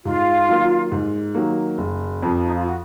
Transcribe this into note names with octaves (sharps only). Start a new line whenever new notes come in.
G#2 F4
D#3 F#3 A#3
G#2
D#3 F#3 A#3
F#1
F2 F3
D#4
F4
F#4